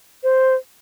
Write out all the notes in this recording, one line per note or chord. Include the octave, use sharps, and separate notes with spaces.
C5